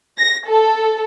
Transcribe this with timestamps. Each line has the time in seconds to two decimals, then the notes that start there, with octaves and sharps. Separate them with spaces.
0.18 A#6
0.47 A4